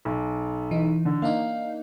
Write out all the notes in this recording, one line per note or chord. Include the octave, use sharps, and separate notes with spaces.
B1
E3 D#4
D3
A#3 D4 D#4 F5